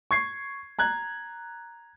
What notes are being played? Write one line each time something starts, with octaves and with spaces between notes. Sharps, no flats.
C#6 G#6 C7
A#5 F#6 G#6